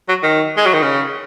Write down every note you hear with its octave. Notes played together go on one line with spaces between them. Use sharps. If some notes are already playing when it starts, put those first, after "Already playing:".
F#3
D#3
G#3
F#3
D#3
C#3